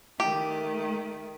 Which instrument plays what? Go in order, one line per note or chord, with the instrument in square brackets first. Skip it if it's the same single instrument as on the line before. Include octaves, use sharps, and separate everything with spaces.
[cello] D#3 A3 [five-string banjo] G4